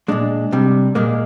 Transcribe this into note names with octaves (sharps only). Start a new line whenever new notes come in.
A#2 G#3 D4
C3 G3
A#2 G#3 A#3